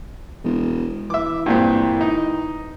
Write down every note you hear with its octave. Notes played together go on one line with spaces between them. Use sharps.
E1
E3 E5 D6
G2 A#2 C4
D#4